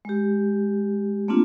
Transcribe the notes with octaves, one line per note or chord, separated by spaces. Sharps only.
G#3 G4
A3 A#3 C4 D4 F4